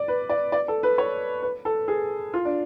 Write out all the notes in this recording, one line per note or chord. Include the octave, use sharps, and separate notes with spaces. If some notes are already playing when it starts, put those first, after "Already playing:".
Already playing: D5
B4
D5
D5
A4
B4
C#5
B4
A4
G#4
F4
D4